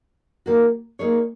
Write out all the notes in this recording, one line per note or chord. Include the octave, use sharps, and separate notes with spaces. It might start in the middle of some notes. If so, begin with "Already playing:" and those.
D#3 A#3 F#4
A#3 D#4 G#4 C#5